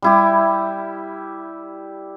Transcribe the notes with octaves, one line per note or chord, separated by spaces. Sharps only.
G3 E4 G4